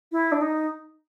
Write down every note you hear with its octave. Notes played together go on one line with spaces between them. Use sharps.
E4
D4
D#4